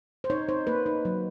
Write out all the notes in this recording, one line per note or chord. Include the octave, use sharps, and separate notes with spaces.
C5
D#4 C#5
D#4 C5
A#3 B4
D#4
F#3